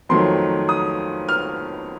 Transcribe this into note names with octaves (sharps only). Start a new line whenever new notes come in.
F2 D#3 F#3 A3 C6
D#6
F6